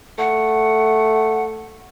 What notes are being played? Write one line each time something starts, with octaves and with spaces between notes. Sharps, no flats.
A3 F#5